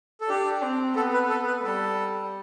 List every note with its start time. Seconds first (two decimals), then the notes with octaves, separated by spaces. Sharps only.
0.21 A4
0.29 D4 G4
0.62 C4
0.96 B3 A4
1.14 B4
1.30 A4
1.47 B4
1.63 G3 A4